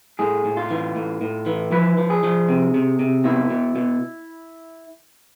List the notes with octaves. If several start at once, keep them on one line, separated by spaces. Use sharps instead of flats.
A2 G#4
A2
F4
E3
A2
A2
E3
F3 B4
F3
G#4
F3
C3
C3
C3
B2 E4
B2
B2